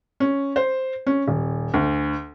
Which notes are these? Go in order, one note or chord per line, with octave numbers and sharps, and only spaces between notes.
C#4
C5
C#4
D#1
D2